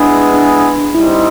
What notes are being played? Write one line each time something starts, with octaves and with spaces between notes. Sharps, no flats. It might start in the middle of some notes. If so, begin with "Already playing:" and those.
Already playing: G#3 B3 D4 E4 G#4
D4
G3 C4 D#4 E4